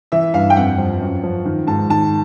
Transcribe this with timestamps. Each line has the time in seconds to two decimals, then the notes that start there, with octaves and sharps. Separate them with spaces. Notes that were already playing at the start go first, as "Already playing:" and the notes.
0.12 E3 E5
0.34 G2 F5
0.50 G5
0.57 F2 F#5
0.78 F3
1.00 F#2
1.23 F3
1.45 D#3
1.67 G#2 A5
1.90 D#3 A5